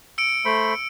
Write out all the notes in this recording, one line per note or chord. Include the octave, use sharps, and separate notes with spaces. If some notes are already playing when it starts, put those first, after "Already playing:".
E6 C#7 D7
A3 C5 B5